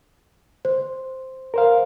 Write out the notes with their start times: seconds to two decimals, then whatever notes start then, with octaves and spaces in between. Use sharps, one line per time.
0.65 C5
1.54 A#4 C5 F5